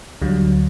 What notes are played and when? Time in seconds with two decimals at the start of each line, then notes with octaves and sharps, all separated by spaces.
0.22 D2 D3 F#3 G3